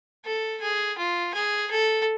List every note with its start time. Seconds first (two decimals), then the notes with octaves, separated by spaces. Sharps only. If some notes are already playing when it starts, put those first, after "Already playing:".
0.25 A4
0.61 G#4
0.98 F4
1.34 G#4
1.71 A4